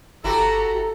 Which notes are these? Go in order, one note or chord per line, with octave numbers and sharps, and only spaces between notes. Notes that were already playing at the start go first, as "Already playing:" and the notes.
G1 E4 F#4 G4 A4 A#5